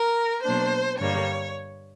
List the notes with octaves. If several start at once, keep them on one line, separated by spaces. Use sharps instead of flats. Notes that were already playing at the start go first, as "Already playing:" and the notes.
Already playing: A#4
B2 F#3 A#3 D4 C5
G2 D3 G3 A#3 C#5